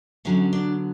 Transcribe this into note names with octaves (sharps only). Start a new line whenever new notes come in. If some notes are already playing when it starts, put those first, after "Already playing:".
D3 F#3 B3 C#4
D4